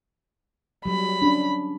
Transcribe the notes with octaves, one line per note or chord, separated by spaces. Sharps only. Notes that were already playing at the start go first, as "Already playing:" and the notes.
F#3 G3 B5
C#4 D4